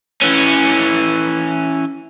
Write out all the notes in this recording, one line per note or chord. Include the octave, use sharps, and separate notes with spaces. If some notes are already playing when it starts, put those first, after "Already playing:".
E3 C#4